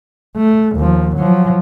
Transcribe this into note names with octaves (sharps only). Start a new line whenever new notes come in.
A3
D#2 F3
F3 F#3